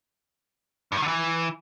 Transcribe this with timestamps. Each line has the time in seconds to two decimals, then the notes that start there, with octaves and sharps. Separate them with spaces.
0.92 G2
0.97 D#3
1.02 D3
1.08 E3